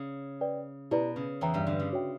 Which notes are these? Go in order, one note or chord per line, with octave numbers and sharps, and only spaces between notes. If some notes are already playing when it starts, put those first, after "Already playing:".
Already playing: C#3
B4 D5 G5
B2 E4 G4 B4 D5 A#5
C#3
E2 E3 C#5 G5 A#5
G2 G3
D3
C#3
F#4 C#5 E5 G5